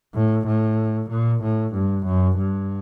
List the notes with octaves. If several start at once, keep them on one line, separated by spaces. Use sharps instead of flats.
A2
A2
A#2
A2
G2
F#2
G2